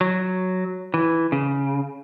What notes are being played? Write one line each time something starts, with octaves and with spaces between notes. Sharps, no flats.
F#3
E3
C#3